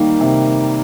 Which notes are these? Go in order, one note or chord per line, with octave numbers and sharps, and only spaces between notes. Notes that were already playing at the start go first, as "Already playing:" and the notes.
Already playing: D#3 G3 A#3
C3